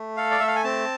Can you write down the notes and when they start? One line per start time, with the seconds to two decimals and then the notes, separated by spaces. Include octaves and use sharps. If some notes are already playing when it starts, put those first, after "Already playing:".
Already playing: A3
0.17 A4 F5
0.31 D5
0.40 A3 E5
0.47 F5
0.56 G#5
0.64 C4 A5